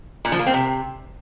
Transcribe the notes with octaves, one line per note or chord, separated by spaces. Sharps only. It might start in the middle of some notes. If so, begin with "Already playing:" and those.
A#2
F3
A#3
C4
C3